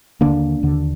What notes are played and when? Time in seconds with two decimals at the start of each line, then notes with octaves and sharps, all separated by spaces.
0.21 D#2 D3 A#3 D4
0.63 D#2 D3